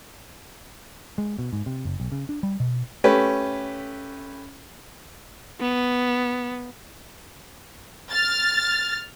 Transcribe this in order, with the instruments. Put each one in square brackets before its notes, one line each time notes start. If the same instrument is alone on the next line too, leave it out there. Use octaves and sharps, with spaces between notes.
[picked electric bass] G#3
B2
G#2
C3
F#1
B1
C#3
D4
G3
B2
[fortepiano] A3 C#4 G4 B4
[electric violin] B3
[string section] F6 A6